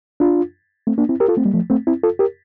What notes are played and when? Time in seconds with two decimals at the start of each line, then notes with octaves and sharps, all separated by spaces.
0.20 D4 F4
0.87 A3 C4
0.98 A#3 D4
1.09 C4 E4
1.20 G4 A#4
1.28 F4 A4
1.37 A3 C4
1.45 G3 A#3
1.54 F3 A3
1.70 A3 C4
1.87 C4 E4
2.03 F4 A4
2.19 G4 A#4